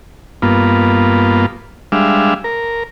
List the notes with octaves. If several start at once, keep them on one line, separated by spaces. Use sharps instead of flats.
G2 A#3 B3 F4
G3 G#3 D4 E5 F5
A#4